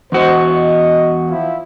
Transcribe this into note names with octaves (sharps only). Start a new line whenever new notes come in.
E2 F#4 C5 D#5
D#5
F3 E4